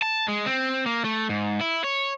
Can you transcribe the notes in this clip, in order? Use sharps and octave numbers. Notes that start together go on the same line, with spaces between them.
A5
G#3
C4
A#3
A3
G#2
E4
C#5